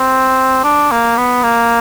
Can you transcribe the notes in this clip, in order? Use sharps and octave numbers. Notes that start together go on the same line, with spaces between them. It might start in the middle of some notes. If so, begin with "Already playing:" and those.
Already playing: C4
D4
A#3
B3
A#3